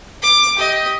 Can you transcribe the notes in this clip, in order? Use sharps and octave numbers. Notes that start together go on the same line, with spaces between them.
D6
G4 D#5